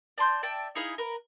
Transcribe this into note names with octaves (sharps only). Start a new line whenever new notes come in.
D5 A5 C6 G6
D5 E5 G5 A5
D#4 E4 G#4 F5
A#4 B4